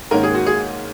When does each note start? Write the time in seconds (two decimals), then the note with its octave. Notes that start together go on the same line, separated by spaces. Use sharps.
0.11 G#2 D#3 A#3 C#4 A#4
0.23 G#4
0.35 F#4
0.46 G#4